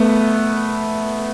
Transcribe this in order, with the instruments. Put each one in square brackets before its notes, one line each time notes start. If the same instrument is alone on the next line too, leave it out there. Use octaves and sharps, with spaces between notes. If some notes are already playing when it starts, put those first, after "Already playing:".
Already playing: [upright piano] A3 B3